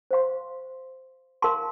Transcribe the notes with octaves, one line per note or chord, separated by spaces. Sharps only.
C5 F5 C6
A#4 F5 A5 C6